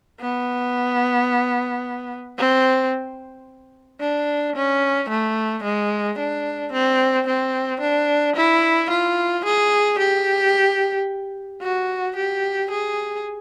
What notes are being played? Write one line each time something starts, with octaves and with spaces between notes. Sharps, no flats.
B3
C4
D4
C#4
A3
G#3
D4
C4
C4
D4
E4
F4
G#4
G4
F#4
G4
G#4